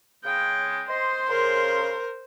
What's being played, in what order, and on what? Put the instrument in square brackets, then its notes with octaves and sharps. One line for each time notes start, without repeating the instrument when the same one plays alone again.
[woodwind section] C#3 G#3 [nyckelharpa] G5
[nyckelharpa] C5 [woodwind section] D#5 C6
[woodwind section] C#3 C6 [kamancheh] A#4